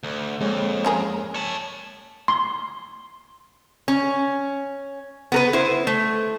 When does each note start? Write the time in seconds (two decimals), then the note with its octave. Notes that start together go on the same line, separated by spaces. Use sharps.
0.03 D2
0.41 F2 G#3 A#3 C#5
0.85 C#4 G#4 A#4
1.35 C#5 A5
2.28 C6
3.88 C#4
5.32 B3 A#4 B4
5.53 E4 C5
5.87 A3